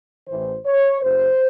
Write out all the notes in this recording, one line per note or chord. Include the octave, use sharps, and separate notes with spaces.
A1 A2 E3 C5
C#5
F#1 F#2 C#3 C5